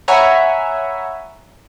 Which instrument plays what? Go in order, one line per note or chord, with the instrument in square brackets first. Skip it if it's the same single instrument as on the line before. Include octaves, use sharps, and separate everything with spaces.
[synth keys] C#5 E5 F#5 G#5 A#5 B5